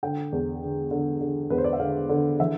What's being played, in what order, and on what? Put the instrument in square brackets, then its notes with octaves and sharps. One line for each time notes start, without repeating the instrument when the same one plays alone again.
[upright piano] D3 G5
E2
D3
D3
D3
E2 B4
C5
D5
E5
D3 F5
D3
E3 E5